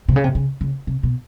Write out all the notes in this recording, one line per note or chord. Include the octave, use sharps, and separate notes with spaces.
C3
C#3
C3
C#3
C#3
C3
B2